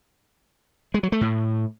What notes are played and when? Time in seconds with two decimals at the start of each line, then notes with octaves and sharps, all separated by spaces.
0.94 G#3
1.03 F#3
1.12 A3
1.21 A2